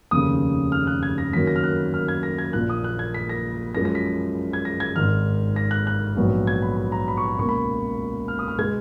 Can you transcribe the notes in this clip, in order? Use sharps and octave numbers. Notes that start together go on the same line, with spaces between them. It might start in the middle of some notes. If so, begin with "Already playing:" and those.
F1 D#2 C#3 D#6
F6
F#6
G#6
A#6
F#2 D#3 F#3 A#3 B6
A#6
F6
F#6
F6
G#6
A#6
G#6
A#1 A#2 F3 A#3 F#6
D#6
F#6
G#6
B6
A#6
F#2 F3 G#3 A#6
A#6
B6
G#6
A#6
G#6
G#1 G#2 D#3 F6
A#6
F#6
F#6
A#1 G#2 F#3 B3
G#6
B5
B5
A#5
B5
C#6
B5
C#2 B2 A#3 C#6
B5
F6
D#6
F6
B2 G#3 B3 G#6